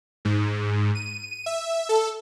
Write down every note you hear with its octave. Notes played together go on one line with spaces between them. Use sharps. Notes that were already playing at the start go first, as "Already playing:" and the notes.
G#2
D#7
E5
A4